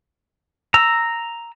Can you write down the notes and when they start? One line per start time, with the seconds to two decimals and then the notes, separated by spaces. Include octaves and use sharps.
0.74 A#5 E6